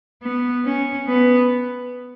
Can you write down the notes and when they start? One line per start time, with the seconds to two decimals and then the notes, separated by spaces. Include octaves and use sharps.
0.22 B3
0.65 C#4
1.07 B3